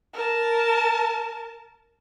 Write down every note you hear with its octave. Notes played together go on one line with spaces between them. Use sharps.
A#4 A5